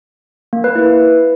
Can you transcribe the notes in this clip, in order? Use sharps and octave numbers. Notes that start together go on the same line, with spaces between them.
A#3
B4
E4